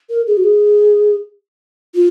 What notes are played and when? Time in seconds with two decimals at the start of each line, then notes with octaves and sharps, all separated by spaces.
0.10 A#4
0.27 G#4
0.37 F#4
0.44 G#4
1.95 F4